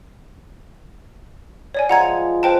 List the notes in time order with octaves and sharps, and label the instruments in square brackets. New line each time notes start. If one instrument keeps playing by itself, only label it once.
[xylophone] C#5 D5 G#5
[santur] F3 G#3 [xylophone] F#5 A#5 G#6
[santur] B4 [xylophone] C5 G5 A5